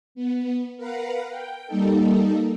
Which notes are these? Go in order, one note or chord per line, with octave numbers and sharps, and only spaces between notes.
B3
A#4 B4 F5 F#5
G5
G3 A#3 D#4 A4